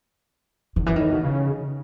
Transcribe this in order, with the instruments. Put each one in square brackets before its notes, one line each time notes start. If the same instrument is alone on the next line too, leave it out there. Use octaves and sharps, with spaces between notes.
[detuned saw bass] E2 [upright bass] D#3
[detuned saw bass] F#2 [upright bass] E3
[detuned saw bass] A2 [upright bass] D#3
[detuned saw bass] B2
C#3